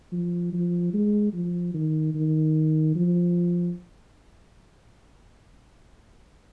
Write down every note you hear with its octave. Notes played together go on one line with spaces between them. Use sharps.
F3
F3
G#3
F3
D#3
D#3
F3